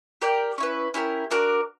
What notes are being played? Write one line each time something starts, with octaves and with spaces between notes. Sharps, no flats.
G4 A#4 D5 G5
C#4 E4 B4
C#4 E4 G4 A#4
D4 F#4 A#4 D5